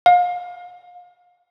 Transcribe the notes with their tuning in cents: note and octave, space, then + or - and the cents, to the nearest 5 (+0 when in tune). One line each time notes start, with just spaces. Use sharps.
F5 +35